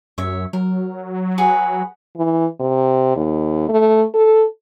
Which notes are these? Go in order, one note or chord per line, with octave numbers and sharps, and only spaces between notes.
F#2 C#5 E5
F#3 A#4
F#4 G#4 B4
E3
C3
D#2
A3
A4